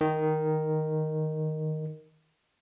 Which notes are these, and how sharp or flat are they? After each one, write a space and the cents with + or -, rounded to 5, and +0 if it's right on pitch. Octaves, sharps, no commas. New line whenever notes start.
D#3 +0